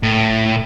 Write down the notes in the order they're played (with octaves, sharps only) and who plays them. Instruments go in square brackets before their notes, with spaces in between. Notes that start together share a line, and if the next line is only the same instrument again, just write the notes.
[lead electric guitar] A2